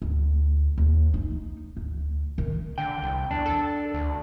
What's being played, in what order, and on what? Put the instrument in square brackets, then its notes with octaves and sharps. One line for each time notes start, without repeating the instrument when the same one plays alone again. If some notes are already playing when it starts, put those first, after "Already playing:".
[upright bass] D2
D#2 C#4
D#4
D2
D#3
[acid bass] D3 [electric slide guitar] G5
[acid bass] C2
[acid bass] E2 [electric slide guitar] D4
[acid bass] A4
D2